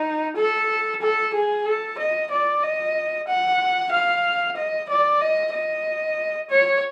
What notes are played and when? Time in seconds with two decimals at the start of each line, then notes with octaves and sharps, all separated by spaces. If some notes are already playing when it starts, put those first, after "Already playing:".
Already playing: D#4
0.37 A4
1.01 A4
1.34 G#4
1.66 A4
1.99 D#5
2.31 D5
2.63 D#5
3.28 F#5
3.92 F5
4.57 D#5
4.89 D5
5.21 D#5
5.53 D#5
6.51 C#5